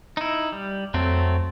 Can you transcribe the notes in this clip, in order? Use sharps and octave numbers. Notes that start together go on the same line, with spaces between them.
D#4 E4
G3
F2 F#3 A3 C4